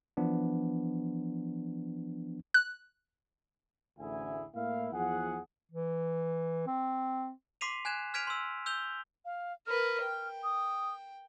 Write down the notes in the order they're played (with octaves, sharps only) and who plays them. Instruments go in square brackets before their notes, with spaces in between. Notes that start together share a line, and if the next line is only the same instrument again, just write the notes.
[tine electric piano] E3 F3 B3 D4
[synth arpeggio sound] F#6
[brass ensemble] A1 D2 E4 G#4 G#5
A2 A#3 E4 F5
E2 F3 G#4 F#5
[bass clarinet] E3
C4
[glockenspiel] C6 D6 B6 C7 D#7 F7
G#5 F#6 G#6 E7
F6 G#6 B6 D7 D#7 F7
C6 E6
E6 G6 F7 G7
[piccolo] F5
[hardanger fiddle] A#4 B4 [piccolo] F6
[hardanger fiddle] G5
[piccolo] D#6